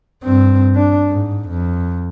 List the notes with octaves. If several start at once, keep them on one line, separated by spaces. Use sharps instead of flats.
G2 C4
D4
G#2
F2